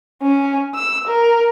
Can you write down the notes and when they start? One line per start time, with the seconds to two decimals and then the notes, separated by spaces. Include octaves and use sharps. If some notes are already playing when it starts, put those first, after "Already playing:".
0.22 C#4
0.75 E6
1.07 A#4